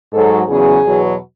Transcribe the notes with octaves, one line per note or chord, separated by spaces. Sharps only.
G#2 F#3 A4
E2 C#3 F#3 G#4
E2 B2 F#3